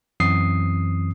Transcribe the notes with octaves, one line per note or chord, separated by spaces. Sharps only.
F#2 E3 C4 D#6 C7